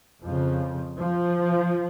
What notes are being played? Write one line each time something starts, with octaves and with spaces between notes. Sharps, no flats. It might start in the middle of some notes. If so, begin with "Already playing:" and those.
F2 C#3 F3
F3